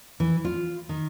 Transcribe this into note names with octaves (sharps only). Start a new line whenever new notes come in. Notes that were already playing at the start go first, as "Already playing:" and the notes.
E3
F4
D#3